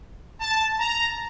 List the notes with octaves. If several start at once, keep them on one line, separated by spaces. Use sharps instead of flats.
A5
A#5